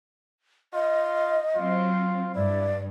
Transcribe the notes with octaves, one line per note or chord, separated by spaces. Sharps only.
F4 D#5
F#3 C4 F4
G2 E4 D5